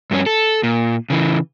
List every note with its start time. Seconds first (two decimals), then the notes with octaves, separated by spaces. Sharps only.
0.11 G2 C#4
0.26 A4
0.63 A#2
1.10 C#3 E3